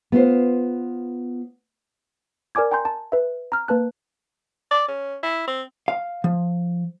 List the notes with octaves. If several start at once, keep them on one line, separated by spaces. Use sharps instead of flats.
B3 F4 C5
A#4 D5 G#5 D6 G#6
G5 G#5 A#5 C6 G6
A5
B4 E5
A#5 F6
A#3 B4 A5 F#6
D5
C#4
E4
C4
F5
F3